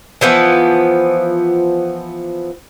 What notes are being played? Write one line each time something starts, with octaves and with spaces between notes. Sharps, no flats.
E3 F3 B3